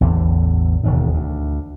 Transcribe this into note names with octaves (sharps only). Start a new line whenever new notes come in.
A1 E2 D3
E1 D#2 G#2
D2